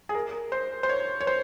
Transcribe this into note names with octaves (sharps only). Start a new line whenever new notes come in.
G#4
A#4
C5
C5
C#5
C#5
C5